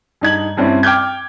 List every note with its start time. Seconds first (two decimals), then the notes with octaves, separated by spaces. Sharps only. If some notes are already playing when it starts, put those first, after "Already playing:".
0.21 G2 D#4 G#6 F#7
0.57 G2 C4 C#4 E4
0.83 G5 D6 F6 G6 G#6